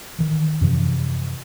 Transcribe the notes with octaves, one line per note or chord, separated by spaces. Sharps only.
D#3 E3
F#2 C3 E3 F3